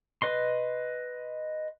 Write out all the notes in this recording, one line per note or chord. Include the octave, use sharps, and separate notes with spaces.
B4 D#5 C6